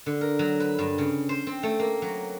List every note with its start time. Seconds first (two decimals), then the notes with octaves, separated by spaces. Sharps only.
0.06 D3
0.21 A#4
0.39 F#3
0.60 B4
0.79 G2
0.98 C#3
1.29 C5
1.47 C4
1.63 A3
1.79 A#3
2.02 F#3